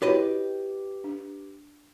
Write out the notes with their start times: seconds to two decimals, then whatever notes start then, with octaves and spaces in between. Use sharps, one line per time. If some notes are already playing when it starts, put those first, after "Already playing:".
0.02 E4 F#4 G4 B4 C#5 D#5
1.04 D4